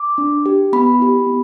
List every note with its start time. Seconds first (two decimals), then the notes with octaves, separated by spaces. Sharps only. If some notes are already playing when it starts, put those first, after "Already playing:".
Already playing: D6
0.18 D4
0.46 G4
0.73 B3 B5
0.99 E4 G4
1.26 B3